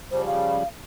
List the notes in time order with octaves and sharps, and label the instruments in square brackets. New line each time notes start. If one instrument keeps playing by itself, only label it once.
[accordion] C#3 F3 G3 [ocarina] C5
[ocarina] F5